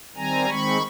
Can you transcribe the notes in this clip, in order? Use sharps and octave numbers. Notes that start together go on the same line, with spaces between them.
D#3 G3 C4 G#5 A#5
D#3 G#3 C4 B5 C#6